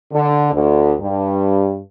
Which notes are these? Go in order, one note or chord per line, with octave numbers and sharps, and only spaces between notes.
D3
D2
G2